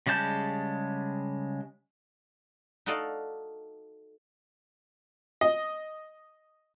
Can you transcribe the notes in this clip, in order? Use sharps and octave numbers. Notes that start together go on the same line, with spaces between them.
C#3 G3 G#3 A5 G6
D#4 F#4 A4 D5 D#5 F5
D#5